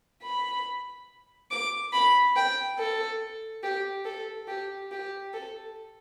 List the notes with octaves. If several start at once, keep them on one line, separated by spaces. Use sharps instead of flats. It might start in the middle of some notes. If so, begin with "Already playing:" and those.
B5
D6
B5
G5
A4
G4
A4
G4
G4
A4